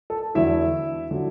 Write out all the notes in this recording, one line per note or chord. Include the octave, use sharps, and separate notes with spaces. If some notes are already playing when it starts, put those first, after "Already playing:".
A4
E2 D3 F#3 E4 E5
D3 F#3